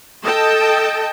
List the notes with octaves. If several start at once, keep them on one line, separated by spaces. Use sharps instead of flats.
A4 D#5 G5 A5